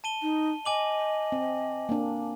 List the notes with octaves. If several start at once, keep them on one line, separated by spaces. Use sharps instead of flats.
A5 D#7 G7
D#4
D#5 G#5 D6 F#7
C4
A#3 D4